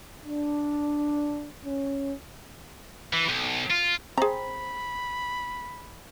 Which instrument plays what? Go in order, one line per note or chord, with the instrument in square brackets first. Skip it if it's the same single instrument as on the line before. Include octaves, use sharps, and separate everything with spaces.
[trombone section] D4
C#4
[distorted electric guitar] E3
B1
F4
[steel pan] C4 [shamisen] G#4 A#5 [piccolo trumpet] B5